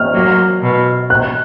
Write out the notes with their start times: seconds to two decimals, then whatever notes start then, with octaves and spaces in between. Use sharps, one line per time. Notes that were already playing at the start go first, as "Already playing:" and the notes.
Already playing: F6
0.14 F#3 A#3
0.62 B2
1.10 F#6